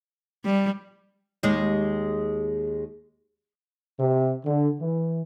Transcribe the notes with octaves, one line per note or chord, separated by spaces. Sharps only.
G3
D#2 G#3
C3
D3
E3